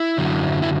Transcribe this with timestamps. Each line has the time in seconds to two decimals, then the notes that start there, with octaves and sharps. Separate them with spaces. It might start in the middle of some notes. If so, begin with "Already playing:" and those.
Already playing: E4
0.18 F#2 D3 F#3
0.62 E4